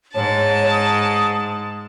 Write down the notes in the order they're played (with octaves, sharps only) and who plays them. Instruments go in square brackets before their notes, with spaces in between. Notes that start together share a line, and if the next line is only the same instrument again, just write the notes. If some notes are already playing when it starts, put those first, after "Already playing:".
[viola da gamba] G#2 [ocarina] C#5 [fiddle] A5
[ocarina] D#6